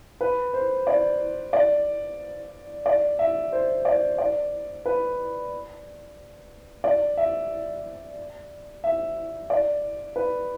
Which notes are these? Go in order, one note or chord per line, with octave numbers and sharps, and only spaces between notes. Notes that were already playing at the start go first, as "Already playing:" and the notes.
B4
C5
D5
D5
D5
E5
C5
D5
D5
B4
D5
E5
E5
D5
B4